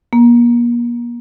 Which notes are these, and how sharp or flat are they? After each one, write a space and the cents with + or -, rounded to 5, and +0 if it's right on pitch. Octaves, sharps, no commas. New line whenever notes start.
A#3 +40